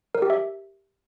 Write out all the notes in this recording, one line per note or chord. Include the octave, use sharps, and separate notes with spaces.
A#4
G4
E5